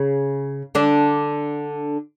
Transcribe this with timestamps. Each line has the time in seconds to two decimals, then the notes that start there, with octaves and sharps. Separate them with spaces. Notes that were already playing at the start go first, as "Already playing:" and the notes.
Already playing: C#3
0.75 D3 D4